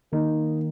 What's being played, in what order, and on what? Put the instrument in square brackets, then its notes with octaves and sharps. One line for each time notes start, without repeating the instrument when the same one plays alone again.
[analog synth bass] D#3 [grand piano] A#3 D#4